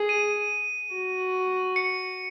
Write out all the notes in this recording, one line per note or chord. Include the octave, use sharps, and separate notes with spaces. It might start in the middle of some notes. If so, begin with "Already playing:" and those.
Already playing: G#4
D#7
F#4
C#7